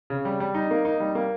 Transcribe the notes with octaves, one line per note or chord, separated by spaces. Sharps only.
C#3
G3
G3
D#4
A#3
D#4
G3
A#3